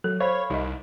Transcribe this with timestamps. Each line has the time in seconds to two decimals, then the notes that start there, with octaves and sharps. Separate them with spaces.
0.04 F#3 A4
0.20 C5 C#5 F5 B5
0.50 C2 D#4 D#5